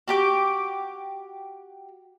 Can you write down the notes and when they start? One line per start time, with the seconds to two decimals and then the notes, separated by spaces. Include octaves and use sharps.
0.08 F#4 G4 D6